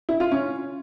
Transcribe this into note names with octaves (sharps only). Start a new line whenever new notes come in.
E4
F4
C#4